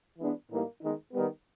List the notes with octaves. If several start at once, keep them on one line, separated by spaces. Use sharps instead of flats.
E3 G#3 B3 D4
A2 E3 G3 A#3 D#4
D#3 G#3 B3 D#4
D#3 G3 B3